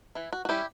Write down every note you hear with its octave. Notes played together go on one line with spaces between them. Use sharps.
E3 E4
F#4
F#4
G3 C#4 E4 G4